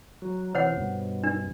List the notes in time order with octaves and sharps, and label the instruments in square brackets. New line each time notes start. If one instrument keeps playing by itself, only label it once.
[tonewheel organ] F#3
[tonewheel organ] C3 E3 [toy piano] C5 C#5 F#5
[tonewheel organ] G2 B2
[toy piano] D4